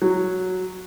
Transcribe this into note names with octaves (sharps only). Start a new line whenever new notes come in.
F#3